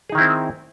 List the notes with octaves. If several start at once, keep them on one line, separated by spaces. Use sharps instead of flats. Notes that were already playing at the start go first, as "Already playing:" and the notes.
D#3 C4 D#4 E4 G#4